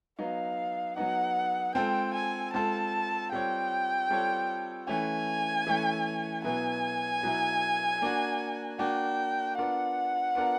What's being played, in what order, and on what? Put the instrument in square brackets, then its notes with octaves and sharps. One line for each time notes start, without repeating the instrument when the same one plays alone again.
[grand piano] F#3 B3 D#4 [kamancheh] F5
[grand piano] F#3 B3 D#4 [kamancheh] F#5
[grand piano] G#3 C4 F4 A4 [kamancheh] G5
[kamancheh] G#5
[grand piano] G#3 C4 F4 A4 [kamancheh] A5
[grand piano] G3 C4 F4 A4 C#5 [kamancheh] G5
[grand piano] G3 C4 F4 A4 C#5
[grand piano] E3 A3 C#4 [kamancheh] G#5
[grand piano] E3 A3 C#4
[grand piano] B2 F#3 B3 E4 [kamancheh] G#5
[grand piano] B2 F#3 B3 E4
A#3 D4 F#4
[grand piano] A#3 D4 F#4 [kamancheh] G5
[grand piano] B3 D4 F4 A#4 [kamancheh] F#5
[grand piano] B3 D4 F4 A#4